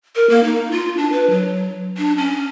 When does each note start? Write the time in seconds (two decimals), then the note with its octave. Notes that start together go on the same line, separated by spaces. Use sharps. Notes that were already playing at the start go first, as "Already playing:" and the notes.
0.16 A#4
0.30 A#3
0.44 D#4
0.71 F4
0.97 D4
1.13 B4
1.30 F#3
1.98 D4
2.18 C#4